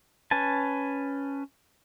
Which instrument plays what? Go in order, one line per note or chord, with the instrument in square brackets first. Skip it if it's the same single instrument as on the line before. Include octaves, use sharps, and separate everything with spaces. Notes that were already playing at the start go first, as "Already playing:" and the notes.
[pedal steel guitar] C#4 B4 G#5 A5